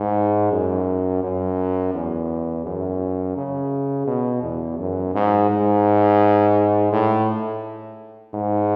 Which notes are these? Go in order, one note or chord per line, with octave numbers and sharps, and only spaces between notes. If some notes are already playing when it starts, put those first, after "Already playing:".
Already playing: G#2
F#2
F#2
E2
F#2
C#3
B2
E2
F#2
G#2
G#2
A2
G#2